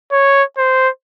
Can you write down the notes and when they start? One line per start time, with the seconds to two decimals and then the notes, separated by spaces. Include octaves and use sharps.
0.12 C#5
0.58 C5